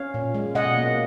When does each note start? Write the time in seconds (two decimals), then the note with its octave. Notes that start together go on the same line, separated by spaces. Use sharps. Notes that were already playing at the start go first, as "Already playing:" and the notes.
Already playing: C#4 C#5 F5
0.14 A#2
0.35 G#3
0.55 B2 D#5 F#5
0.76 A#3